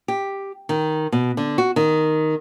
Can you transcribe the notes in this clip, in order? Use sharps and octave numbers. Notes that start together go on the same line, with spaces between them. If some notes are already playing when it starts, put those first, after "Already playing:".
G4
D#3
B2
D3
F#4
D#3